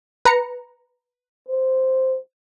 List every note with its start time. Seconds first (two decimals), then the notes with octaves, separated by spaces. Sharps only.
0.25 B4 A#5 C#7
1.49 C5